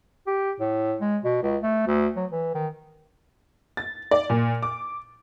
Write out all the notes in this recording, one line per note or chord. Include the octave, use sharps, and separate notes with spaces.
G4
A2
G#3
B2
C#2
A3
D2
F#3
E3
D#3
A6
D5
A#2
D6